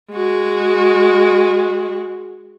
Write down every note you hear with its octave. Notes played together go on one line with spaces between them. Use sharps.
G#3 F#4